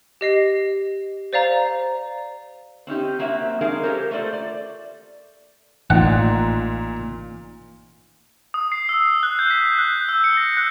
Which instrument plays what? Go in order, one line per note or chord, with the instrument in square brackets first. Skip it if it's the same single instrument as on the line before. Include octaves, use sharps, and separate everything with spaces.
[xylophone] G4 D#5 C7
C5 D5 F5 A#5
[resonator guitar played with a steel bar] C4 C#4 D#4 G4
F#3 A#3 C4 C#4 E5
G#3 D4 D#4 G#4 A#4 F5
C#4 G4 A4 A#4 C5 C#5
A3 F4 A4 C5 D5
D5
[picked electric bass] A1 [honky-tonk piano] A#2 [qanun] D#4 F4 [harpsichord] F#5
[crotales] D#6
C7
E6
F#6
G6
B6
F#6
E6
C#7
A#6
F#6